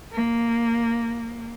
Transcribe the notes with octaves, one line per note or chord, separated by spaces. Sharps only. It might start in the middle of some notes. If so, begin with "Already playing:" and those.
A#3